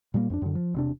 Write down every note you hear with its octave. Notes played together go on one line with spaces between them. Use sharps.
A#2 G3 G#3 A#3
F2 B3 D4
F#2 D3
F3
E1 C3 D4